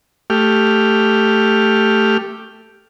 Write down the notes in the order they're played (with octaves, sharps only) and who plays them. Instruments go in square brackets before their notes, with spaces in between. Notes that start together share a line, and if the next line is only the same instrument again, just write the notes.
[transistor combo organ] A3 G4 F6